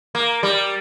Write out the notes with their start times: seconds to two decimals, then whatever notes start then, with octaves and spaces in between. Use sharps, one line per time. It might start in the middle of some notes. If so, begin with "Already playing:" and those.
0.15 A#3
0.43 G3